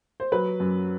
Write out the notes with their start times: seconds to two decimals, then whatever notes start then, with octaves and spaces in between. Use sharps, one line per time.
0.20 C5
0.32 F#3 B4
0.60 F#2